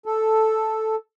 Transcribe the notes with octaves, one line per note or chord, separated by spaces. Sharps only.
A4